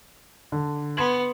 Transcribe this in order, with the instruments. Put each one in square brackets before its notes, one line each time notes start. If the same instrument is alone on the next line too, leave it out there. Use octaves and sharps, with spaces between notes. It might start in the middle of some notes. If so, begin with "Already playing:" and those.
[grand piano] D3
[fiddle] B3 [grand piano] C6 G#6 F#7